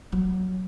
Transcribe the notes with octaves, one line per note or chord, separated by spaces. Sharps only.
F#3